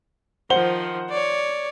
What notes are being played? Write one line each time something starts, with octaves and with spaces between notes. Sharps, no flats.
D#3 F3 C5 F#5 G7
C#5 D5